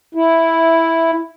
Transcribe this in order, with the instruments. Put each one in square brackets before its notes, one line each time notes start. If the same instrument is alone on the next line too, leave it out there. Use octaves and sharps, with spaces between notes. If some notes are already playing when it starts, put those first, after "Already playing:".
[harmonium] E4